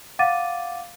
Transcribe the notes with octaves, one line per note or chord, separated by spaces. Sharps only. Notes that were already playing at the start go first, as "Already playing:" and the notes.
F5 F#5 D6 A6 D#7